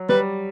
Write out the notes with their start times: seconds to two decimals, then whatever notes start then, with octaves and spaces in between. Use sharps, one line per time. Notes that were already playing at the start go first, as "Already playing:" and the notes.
Already playing: F#3
0.09 G3 B4